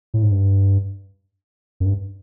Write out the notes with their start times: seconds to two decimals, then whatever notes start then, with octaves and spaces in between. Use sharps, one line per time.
0.14 A2
0.23 G#2
0.32 G2
1.80 F#2
1.86 G2